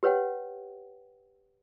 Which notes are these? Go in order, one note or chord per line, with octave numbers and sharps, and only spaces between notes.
G4 B4 C#5 F#5 G5